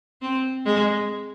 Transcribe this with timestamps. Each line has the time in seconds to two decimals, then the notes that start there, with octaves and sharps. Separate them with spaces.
0.22 C4
0.66 G#3